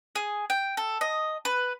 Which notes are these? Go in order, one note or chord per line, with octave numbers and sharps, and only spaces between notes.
G#4
G5
A4
D#5
B4